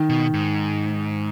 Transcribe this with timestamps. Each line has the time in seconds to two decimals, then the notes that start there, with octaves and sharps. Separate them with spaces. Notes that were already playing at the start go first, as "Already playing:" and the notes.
Already playing: D#3
0.09 B2
0.34 G#2